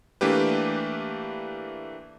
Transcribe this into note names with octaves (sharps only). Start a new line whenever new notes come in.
E3 A3 A#3 D4 G4 B4